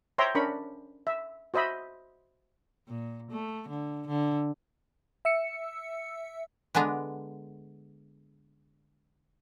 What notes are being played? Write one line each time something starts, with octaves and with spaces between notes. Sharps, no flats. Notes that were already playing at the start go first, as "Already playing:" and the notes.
C5 C#5 E5 G5 A#5 C6
C#4 D4 A#4 B5 C#6
E5
F#4 C5 D#5 E5 B5
A#2
A3
D3
D3
E5 E6 C#7
D3 G#3 B3 D4 A#5